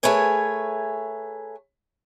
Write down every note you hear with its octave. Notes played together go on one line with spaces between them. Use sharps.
A3 G#4 A#4 B4 C#5 G#5